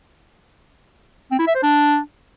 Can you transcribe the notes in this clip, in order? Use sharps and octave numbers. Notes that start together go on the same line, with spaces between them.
C4
E4
E5
C5
D4